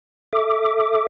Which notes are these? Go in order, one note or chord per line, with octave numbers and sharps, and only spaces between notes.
A4 E5 D6